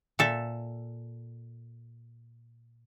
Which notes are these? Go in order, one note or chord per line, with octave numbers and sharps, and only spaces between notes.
A#2 A4 E5